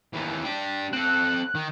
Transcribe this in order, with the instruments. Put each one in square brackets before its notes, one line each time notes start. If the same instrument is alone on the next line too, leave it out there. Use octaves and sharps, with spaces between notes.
[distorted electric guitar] D#2 E3
D4 G4
[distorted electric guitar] C4 A4 [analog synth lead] F#6
[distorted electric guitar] D#3